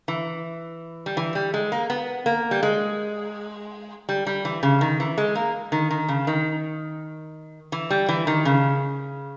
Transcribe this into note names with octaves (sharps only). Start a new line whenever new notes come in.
E3
G3
E3
G3
G#3
A#3
B3
A#3
G3
G#3
G3
G3
E3
C#3
D#3
E3
G#3
A#3
D#3
D#3
C#3
D#3
E3
G3
E3
D#3
C#3